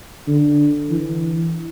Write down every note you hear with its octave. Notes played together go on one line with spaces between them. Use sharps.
D3
E3